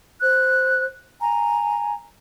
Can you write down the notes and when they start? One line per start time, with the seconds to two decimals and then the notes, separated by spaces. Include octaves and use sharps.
0.21 C5 F#6
1.22 G#5 A#5